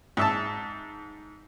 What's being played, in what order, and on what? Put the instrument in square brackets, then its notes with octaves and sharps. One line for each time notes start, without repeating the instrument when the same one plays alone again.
[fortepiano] G#2 E5 A5